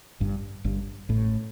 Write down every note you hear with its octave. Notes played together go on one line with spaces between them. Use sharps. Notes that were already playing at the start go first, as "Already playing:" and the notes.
G1 G2
G1 G2
A1 A2